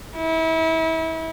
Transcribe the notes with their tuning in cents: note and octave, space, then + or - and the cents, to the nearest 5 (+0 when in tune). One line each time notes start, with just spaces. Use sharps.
E4 -30